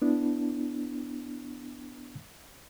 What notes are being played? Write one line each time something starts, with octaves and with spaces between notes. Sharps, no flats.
B3 D4 E4